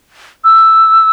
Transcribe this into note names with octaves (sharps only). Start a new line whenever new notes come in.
E6